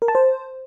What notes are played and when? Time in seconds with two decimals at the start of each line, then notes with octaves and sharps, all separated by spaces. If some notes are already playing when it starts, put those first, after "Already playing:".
0.02 A#4
0.08 A5
0.15 C5